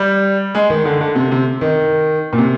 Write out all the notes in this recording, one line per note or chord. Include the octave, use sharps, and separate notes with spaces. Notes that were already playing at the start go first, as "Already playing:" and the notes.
Already playing: G3
G#3
D#3
D3
D3
C3
C3
D#3
A#2
C3